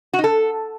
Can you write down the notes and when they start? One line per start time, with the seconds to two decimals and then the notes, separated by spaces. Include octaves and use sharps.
0.13 F#4
0.19 D#4
0.24 A4